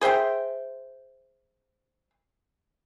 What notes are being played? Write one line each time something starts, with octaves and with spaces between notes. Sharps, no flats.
G#4 C5 E5 G5